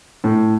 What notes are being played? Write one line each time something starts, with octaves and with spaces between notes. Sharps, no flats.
A2